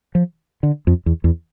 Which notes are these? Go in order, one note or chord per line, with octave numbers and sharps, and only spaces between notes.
F3
D3
F2
E2
E2